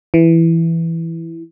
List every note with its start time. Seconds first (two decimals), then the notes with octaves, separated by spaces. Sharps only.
0.14 E3